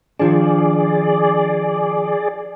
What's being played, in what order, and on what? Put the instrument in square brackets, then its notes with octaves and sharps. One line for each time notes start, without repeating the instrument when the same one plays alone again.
[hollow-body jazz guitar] D#3 F3 D4 [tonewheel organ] G#4 D5